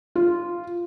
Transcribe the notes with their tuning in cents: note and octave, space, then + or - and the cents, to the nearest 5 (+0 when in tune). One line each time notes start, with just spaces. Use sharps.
F4 -10